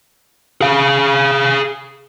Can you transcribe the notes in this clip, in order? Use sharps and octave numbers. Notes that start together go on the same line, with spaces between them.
G#4 F5